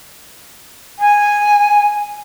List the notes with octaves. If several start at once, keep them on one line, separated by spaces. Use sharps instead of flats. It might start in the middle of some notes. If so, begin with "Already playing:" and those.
G#5